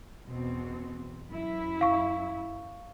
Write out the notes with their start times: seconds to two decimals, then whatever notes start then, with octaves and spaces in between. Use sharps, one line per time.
0.27 E2 B2 C4
1.29 F#2 E4
1.81 F5 C#6